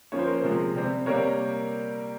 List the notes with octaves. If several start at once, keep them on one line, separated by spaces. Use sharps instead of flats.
F3 A#3 C#4 C#5
C5
A#4
C5
C3 F3 G#3
C3 G3 C4
C3 G3 A#3 A#4 C#5